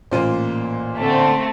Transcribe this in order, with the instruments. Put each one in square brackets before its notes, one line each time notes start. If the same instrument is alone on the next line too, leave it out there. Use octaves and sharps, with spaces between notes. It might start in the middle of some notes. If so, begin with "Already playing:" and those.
[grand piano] A1 A#2 D#7 [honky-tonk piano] A#3 F4 C5
[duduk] D3 [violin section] A3 C4